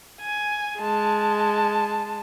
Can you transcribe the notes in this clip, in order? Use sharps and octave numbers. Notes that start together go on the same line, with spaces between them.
G#5
G#3 A5